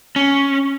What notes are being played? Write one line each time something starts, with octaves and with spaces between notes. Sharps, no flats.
C#4